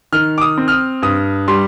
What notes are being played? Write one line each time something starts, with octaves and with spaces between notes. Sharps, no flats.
D#3 F6
D6
D#6
C4
F6
D#6
G2 D#6
G3 C6